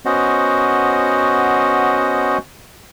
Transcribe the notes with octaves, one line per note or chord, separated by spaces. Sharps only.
B3 C#4 F#4 C5 D#5 F#5